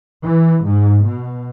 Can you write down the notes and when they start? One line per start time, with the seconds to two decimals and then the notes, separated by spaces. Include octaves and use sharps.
0.23 E3
0.68 G#2
1.06 B2